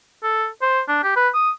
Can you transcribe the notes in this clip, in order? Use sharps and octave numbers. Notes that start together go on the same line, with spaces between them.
A4
C5
D4
G4
B4
D#6